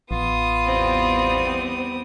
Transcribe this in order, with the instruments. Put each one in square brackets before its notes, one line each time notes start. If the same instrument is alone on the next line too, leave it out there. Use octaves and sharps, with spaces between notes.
[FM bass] A1 [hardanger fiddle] B3 D#6 [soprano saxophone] F4
[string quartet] E2 G3 C4